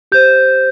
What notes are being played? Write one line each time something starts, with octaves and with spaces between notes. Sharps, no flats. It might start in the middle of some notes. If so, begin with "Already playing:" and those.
G4 C5 G6